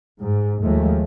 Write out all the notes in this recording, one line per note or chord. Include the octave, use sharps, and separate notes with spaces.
G#2
D#2 F3 G#3 A3